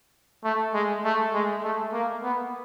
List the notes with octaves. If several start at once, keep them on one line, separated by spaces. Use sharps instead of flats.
A3
G#3
A3
G#3
A3
A#3
B3